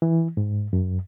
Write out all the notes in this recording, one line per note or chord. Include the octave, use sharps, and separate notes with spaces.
E3
G#2
F#2